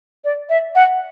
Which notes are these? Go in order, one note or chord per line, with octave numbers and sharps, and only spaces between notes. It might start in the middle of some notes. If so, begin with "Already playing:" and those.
D5
E5
F#5